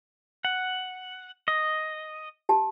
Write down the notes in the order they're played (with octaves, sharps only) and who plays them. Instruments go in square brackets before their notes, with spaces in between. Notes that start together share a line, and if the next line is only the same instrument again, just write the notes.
[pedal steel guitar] F#5
D#5
[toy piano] G4 A5